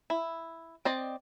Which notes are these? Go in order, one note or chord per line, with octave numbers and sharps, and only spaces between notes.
E4
C4 D5 D#5